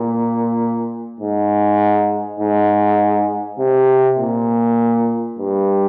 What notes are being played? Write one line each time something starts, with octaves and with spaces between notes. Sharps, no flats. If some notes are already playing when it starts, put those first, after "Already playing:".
Already playing: A#2
G#2
G#2
C3
A#2
G2